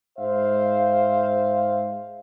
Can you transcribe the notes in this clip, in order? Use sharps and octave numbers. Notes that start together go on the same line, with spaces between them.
G#2 C5 E5 F5